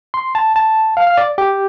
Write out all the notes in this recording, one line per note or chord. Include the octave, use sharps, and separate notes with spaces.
C6
A5
A5
F5
F5
D5
G4